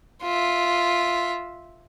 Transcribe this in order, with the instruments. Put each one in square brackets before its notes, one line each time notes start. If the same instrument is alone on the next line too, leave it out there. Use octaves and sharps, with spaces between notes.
[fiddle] F4 E5